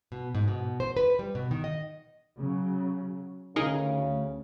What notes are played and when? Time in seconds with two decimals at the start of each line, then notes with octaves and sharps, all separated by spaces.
0.12 B2
0.35 G#2
0.48 B2
0.80 C5
0.97 B4
1.19 G3
1.35 B2
1.51 D#3
1.64 D#5
2.39 C#3 F#3
3.56 D2 C#3 D#4 G#4 A#4